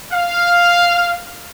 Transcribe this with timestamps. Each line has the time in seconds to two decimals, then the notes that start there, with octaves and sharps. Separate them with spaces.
0.12 F5